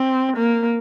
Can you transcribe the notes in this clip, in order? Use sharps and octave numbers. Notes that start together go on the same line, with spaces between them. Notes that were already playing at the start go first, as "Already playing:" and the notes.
Already playing: C4
A#3